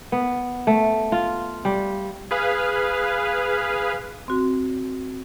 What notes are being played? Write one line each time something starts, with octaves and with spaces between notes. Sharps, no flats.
B3
A3
F4
G3
G#4 B4 F5
C4 F#4